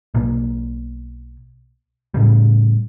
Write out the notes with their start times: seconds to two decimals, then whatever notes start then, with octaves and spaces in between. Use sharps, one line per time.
0.15 B1 B2 A#3
2.14 A2 C#3 G3